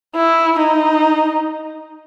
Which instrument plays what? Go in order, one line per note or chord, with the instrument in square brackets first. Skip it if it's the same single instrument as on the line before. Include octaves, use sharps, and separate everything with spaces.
[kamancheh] E4
D#4